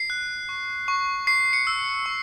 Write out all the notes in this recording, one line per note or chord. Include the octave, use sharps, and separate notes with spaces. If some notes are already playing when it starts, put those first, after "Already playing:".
Already playing: C7
F#6
C#6
C#6
C#6 C7
C#7
E6
C#6